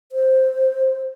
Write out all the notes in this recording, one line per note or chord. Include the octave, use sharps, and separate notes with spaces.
C5